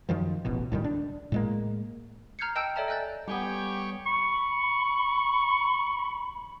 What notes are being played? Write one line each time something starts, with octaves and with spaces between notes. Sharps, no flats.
F#2 D#3 F3
D1 A1 B2
C#2 A2 D#3 G3
D4
A2 G#3 A#3
A#5 F6 G6 G#6 C7 C#7
D#5 G5 A5 E6 G6 D7
A4 C#5 D5 E5 A5 A#5
D#5 G#5 F#6 G6 A6
G3 B3 G4 C#5 G5 G#5 C#6 D6
B5 C#6